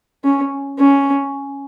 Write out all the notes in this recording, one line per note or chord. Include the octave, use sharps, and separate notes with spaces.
C#4
C#4